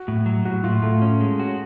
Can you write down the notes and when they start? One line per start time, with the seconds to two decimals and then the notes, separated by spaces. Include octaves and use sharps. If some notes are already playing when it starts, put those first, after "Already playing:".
Already playing: F#4
0.08 A2
0.26 F#3
0.45 A2 F#4
0.64 A2 F4
0.82 A2 A3
1.02 C#4
1.21 G#3
1.39 F#4